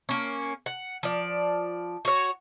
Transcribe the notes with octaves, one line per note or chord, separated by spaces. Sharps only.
A#3 C#4
F#5
F3 D5
F#4 C#5